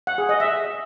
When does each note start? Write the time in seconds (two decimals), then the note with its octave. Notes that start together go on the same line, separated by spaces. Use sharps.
0.07 F#5
0.18 G#4
0.29 D#5
0.40 E5